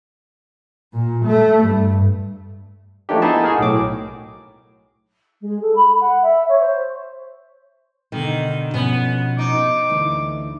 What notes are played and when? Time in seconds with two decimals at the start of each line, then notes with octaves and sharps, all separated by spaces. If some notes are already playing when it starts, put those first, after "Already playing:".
0.93 A#2
1.25 A3
1.63 G2
3.09 F3 A3 A#3 D4 D#4 G4
3.22 B3 D#4 E4 G#4 E5 A5
3.44 F#4 G#4 A#4
3.58 B1 A2 D6
5.41 G#3
5.61 A4
5.75 B5
6.00 F#5
6.22 E5
6.48 C#5
6.59 C5
8.12 B2 D3 D#3
8.74 B2 F3 B3 C#4
9.39 D#4 D6
9.90 D2 E3